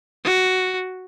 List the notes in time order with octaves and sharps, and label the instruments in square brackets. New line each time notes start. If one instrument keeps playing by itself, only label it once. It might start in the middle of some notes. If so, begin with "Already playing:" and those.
[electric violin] F#4